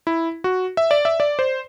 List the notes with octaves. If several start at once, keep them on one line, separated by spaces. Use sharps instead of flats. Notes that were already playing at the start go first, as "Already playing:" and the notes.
E4
F#4
E5
D5
E5
D5
C5